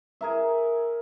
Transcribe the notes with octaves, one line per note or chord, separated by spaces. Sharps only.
G#4 A#4 E5